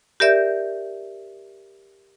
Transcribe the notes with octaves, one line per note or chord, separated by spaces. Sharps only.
G4 A#4 D5 E5 G6